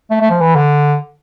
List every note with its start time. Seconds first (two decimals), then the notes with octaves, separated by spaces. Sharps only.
0.11 A3
0.21 A3
0.31 F3
0.41 E3
0.56 D3